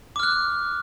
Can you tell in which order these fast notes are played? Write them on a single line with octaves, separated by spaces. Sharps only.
D6 F6 F#6